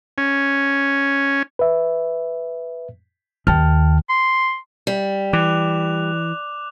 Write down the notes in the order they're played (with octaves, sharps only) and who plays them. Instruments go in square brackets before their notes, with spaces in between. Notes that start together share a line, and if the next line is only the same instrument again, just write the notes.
[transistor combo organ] C#4
[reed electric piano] B4 E5
[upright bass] D#2 [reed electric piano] G5 A5 F6
[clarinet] C6
[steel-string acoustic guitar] G3
[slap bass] E3 [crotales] D6 F#6 F7